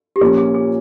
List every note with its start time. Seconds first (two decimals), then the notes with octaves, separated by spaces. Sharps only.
0.16 G4
0.21 A#2 F3 A#3 C#4 G#4
0.38 G#4
0.54 G#4